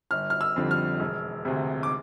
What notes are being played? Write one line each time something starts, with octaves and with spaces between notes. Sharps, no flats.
G1 F6
F6
E6
F2 D3 G3
F6
E1
D2 C3
D6